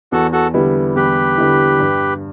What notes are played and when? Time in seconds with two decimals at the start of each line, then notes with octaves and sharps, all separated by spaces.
0.12 E2 F#4 A4
0.32 F#4 A4
0.54 D3 G3 B3 E4
0.96 E2 G4 B4
1.37 D3 G3 B3 E4
1.80 G2